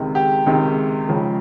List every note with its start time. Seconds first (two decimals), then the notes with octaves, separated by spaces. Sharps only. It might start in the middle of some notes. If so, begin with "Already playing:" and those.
Already playing: C#2 C3 D#3 G#3
0.15 G4
0.46 C#2 C3 D#3 G#3
1.09 C#2 C#3 F3 G#3